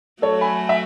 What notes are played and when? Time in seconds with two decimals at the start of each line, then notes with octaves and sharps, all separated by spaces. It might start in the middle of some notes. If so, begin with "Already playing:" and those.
0.22 F#3 A3 A4 C#5
0.41 G#5 B5
0.69 E5